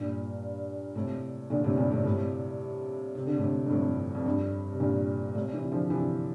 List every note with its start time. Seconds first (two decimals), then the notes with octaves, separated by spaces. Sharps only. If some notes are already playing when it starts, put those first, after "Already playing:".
Already playing: G2 A#2
0.95 A2 C3
1.50 A#2 D3
1.64 A2 C3
1.77 G2 A#2
1.91 A2 C3
2.05 A2 C3
3.15 C3
3.26 D3
3.38 A2 C3
3.66 G2
3.70 F2 A2
4.15 F2
4.26 G2
4.72 C3
4.80 G2 A#2
5.35 A2 C3
5.54 C3 E3
5.72 D3 F3
5.90 C3 E3